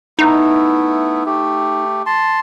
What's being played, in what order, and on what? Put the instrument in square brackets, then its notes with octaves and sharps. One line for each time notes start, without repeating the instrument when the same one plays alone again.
[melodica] A3 B3 E4 [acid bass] D#4
[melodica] A3 G4
A5 C6